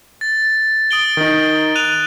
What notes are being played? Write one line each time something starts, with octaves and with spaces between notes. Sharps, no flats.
A6
D#6 D7 G7
D#3 D#4
F#6 D#7 F7